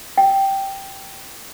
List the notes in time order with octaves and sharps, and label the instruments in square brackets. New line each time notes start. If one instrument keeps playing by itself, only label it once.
[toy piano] G5